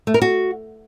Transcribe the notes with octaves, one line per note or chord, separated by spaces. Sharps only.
A3
A#4
F#4